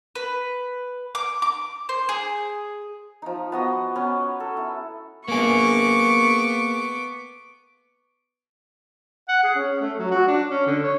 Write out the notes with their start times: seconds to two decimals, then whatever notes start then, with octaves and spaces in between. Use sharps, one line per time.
0.15 B4
1.15 D6
1.42 D6
1.89 C5
2.09 G#4
3.22 F3 D#4
3.52 B3 F#4 D#5
3.96 B3 C#4 B4
4.40 A4
4.57 E4
5.28 A#3 B3 G#4 C#6 D6
9.29 F#5
9.43 G#4
9.56 C#4
9.81 A3
9.99 F#3
10.11 F#4
10.28 D4
10.50 C#4
10.67 D3
10.84 C#5